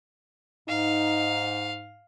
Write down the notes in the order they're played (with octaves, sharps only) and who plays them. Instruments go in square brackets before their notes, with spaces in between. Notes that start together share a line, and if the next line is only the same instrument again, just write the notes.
[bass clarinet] G#2 [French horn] D#4 [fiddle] F5